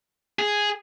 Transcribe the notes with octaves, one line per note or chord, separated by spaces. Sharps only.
G#4